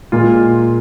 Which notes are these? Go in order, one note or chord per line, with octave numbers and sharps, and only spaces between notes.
A#2 G#3 F4